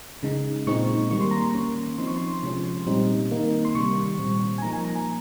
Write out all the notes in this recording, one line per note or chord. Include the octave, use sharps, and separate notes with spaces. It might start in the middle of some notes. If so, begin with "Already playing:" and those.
C#3 G#3 D#4
A#2 G#3 C4 D#4 C#6
D#3 G3 A#3 C#6
C6
A#5
C6
D#3 A#3 C#4
F3 C4 D#4 C6
C#6
C6
C3 F3 G#3 C#4
A#2 G3 C4 D#4
D#3 A#3 D#4
C6
C3 D#3 G3 C#6
A#2 G3 C4
G#5
F3 A#3 D#4 A#5
G#5
A#5
G#5